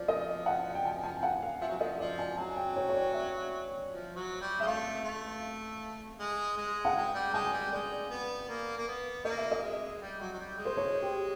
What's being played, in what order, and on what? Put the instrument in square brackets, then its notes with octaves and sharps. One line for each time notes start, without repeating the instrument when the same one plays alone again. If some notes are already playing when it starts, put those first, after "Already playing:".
Already playing: [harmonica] F3 [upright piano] D5
[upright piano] D#5
F#5
G5
G#5
G#5
F#5
F5
[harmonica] F3 [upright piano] E5
[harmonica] F#3
[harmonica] F3 [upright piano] D#5
[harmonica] F3 [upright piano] D5
[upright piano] G#5
[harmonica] F#3 [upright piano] G#5
[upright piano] G5
C#5
C#5
D5
E5
[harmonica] F3
F#3
G3
[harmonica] G#3 [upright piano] E5
[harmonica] A3 [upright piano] F5
[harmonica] A3
G#3
G#3
[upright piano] F#5
[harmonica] G#3 [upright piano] G5
[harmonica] G3
[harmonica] G#3 [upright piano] G#5
[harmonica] G3
[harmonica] G#3 [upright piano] D5
[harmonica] B3
A#3
A#3
B3
[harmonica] A#3 [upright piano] D#5
[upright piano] E5
D#5
[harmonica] G#3
G3
F#3
F#3
G3
G#3
[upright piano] C5
C#5
G4